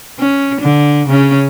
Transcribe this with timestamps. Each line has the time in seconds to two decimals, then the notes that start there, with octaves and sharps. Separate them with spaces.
0.19 C#4
0.61 D3
1.08 C#3 C#4